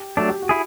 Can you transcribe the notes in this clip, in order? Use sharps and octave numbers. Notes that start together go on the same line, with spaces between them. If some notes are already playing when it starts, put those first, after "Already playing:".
Already playing: G4
F#3 A3 D4 F#4
G4
F#4
E4 G#4